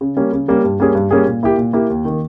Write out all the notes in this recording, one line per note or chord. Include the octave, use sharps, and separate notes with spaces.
C#3
G3 A#3 C#4
C#3
G3 A#3 C#4
G2
G3 A#3 C#4 G#4
G2
G3 A#3 C#4 G#4
A#2
A#3 E4 G4
A#2
A#3 E4 G4
D#2
D#3 A#3